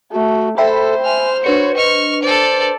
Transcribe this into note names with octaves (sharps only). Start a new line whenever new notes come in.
A3 F#4
A4 C5 E5 G5 B5
G#5 F6
D4 F#4 B4 C#5 C#7
D#5 C#6 F6
A4 C5 D5